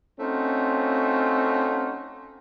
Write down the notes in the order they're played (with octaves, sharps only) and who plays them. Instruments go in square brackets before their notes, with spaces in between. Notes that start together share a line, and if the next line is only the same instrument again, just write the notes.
[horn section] A3 C4 C#4 D#4 F4 F#4